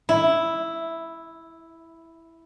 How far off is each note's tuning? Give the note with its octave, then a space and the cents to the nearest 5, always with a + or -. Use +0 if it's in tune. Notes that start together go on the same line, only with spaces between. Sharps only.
E4 +0